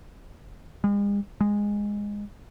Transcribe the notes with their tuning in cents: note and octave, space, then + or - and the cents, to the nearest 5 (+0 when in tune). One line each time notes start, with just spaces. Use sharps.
G#3 -45
G#3 -15